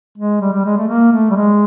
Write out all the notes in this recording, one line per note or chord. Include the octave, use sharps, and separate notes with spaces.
G#3
G3
G3
G#3
A3
A#3
A3
G3
G#3